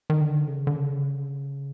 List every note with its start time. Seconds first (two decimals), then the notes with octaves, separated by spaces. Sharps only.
0.10 D#3
0.21 D3
0.47 C#3
0.67 D3
0.76 C#3